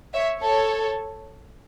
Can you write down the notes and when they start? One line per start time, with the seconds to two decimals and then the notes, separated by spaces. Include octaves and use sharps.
0.13 C#5 E5
0.42 A4 C#5